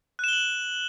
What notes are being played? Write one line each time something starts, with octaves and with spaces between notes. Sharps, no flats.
F#6 E7 F#7 G7